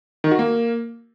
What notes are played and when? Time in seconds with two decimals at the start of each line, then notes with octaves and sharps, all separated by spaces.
0.24 D#3
0.31 F#4
0.39 A#3